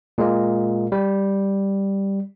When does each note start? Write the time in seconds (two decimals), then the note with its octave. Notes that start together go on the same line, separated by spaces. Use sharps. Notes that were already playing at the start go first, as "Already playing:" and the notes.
0.18 A#2 G#3 A#3
0.92 G3